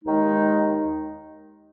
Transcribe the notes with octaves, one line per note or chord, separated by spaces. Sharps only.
D#2 D#3 G#3 D#4